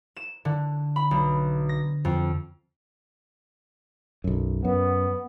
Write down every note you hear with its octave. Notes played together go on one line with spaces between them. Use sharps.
E7
D3
B5
B1
A#6
F2
B1 F#2
F#2 B3